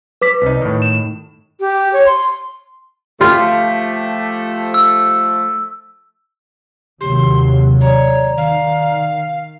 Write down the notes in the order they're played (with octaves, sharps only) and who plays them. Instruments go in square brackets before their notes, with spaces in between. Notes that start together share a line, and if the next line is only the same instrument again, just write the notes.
[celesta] B4 D6 B6
[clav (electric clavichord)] C2 D#4
A2 D#3
[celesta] E7
[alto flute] G4
C#5
C6
[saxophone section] F3 A3 [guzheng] F4 [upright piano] G4
[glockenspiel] E6
[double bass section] D#2 C3 F#3 [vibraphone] G4 [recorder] C6
[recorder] C#5 [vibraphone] D5 A#5
[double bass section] D#3 [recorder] F5